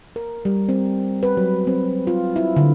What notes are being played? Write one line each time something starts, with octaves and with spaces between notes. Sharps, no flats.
A#4
G3
C4
B4
F#3
C4
F4
E4
D3